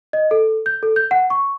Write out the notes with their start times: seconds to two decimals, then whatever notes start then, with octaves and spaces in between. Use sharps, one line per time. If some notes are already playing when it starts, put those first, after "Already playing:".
0.13 D#5
0.31 A4
0.66 G6
0.83 A4
0.96 G6
1.11 F#5
1.30 C#6